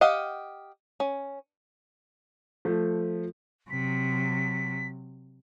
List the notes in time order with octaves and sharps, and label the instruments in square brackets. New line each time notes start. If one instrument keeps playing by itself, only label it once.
[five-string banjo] G4 D#5 F5 F#5
C#4
[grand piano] F3 A3
[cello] C3 F#3 [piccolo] B6